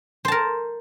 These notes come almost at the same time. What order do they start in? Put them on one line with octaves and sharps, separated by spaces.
C5 A5 A#4